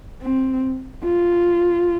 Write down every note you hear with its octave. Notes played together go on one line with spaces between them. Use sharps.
C4
F4